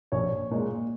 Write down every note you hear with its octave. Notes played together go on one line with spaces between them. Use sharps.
A#1 C#5
A#2 G#3